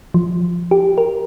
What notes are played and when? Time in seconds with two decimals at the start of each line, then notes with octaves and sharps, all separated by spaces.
0.14 F3
0.71 G4
0.98 A#4